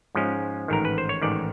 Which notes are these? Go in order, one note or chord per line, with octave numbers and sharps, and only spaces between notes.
G#2 F3 G#3 C#4
A1 G#2 D#3 A#4
B4
C5
C#5
A1 G#2 D#3 D5